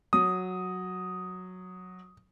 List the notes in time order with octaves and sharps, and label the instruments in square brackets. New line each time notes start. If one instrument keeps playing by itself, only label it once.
[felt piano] F#3 [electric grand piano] D#6